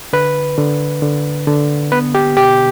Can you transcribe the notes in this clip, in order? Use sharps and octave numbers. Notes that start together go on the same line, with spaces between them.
D3 B4
D3
D3
D3
B3 B4
G4
B2 G4